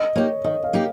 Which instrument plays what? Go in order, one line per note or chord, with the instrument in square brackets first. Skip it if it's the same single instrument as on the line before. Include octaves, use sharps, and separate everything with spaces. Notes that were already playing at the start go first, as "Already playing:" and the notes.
Already playing: [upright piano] D#5
[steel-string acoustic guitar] A#3 D#4 G4 [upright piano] C#5
[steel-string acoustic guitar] D#3 [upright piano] D#5
[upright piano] F5
[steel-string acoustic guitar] A#3 D#4 G4